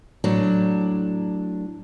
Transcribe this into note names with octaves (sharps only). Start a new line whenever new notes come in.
A2 F#3 D4